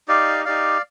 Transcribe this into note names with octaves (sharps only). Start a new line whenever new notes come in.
D#4 G4 D5 F5
D#4 G4 D5 F5